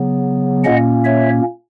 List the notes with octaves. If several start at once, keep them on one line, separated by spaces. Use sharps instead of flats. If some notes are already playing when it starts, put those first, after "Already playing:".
Already playing: C#3 F#3 B3
A#2 A#3 C#4 D#5 F#5
C#5 E5